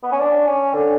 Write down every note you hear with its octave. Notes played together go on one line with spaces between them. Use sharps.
B3
C#4
D4
C#4
D3